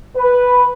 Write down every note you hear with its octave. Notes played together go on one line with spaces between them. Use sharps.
B4